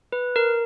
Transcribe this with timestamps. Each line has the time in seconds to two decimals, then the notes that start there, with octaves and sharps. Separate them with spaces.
0.12 B4
0.36 A#4